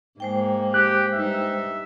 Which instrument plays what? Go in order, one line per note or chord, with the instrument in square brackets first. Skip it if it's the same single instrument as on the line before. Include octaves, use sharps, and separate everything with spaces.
[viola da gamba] G#2 A#3 [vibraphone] G#3 C5 G5
[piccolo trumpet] G4 [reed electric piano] F#6
[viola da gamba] G2 D#4 [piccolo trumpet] E5